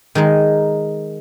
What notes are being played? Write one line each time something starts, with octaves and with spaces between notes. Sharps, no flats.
D#3 G#3 D#4